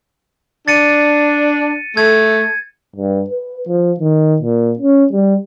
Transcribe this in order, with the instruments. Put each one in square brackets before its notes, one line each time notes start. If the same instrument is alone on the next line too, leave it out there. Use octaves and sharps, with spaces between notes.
[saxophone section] D4 [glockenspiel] A6 C#7 D#7
[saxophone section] A3 [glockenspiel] G#6
[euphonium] G2
B4
F3
D#3
A#2
C#4
G3